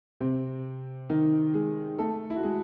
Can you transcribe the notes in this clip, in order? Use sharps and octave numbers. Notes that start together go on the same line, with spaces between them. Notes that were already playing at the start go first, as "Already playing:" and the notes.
C3 C4
D#3 D#4
G#3 G#4
A3 A4
E4
F#4
G#3 G#4